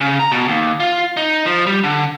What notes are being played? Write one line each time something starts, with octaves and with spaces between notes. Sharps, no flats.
C#3
A#5
B2
D#2
F4
D#4
F3
G3
D3